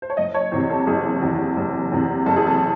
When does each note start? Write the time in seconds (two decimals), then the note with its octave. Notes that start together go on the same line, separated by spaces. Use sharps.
0.02 C5
0.10 C#5
0.17 F#1 D#5
0.34 C#5
0.52 E2 C3 C5
0.70 A4
0.86 F#1 G#4
1.22 E2 C3
1.56 F#1
1.92 E2 C3
2.26 F#1 A4
2.36 G#4
2.47 A4